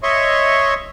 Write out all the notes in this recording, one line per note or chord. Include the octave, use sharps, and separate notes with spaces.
C#5 D#5 E5 C6 C#6